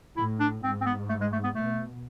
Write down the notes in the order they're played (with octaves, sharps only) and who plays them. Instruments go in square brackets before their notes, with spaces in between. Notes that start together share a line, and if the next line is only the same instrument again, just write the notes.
[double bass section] A2 [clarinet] E4
[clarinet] D4
[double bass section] G#2 [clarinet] C4
[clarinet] C4
B3
A3
G#3
A3
B3
[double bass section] B2 [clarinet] A3